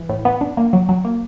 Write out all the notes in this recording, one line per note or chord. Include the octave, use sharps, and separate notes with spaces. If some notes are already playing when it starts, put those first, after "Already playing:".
Already playing: E3
A2
B3
D4
A#3
F#3
F#3
A#3